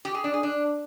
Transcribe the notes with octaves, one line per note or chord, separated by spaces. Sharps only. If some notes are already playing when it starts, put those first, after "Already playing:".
G4
G#4
D4
G#4
D4